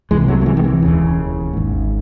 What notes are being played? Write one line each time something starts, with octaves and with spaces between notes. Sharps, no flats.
C2 C3 E3 G#3
F#3 A3
A3
E3 G#3
D#3
E3
E1 D#2 C#3
G#1 G#2